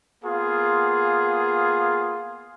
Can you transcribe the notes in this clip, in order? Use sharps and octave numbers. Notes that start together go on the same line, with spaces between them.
A#3 B3 F4 G#4